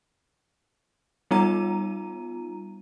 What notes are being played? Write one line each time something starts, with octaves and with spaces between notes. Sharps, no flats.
G3 B3 D#4 F4 A#5 D#7